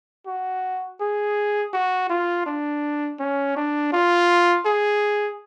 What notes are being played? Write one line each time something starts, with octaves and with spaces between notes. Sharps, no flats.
F#4
G#4
F#4
F4
D4
C#4
D4
F4
G#4